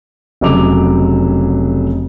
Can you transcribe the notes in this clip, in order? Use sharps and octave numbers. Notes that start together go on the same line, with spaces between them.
F1 C#3 F#3 D#5 D6 F7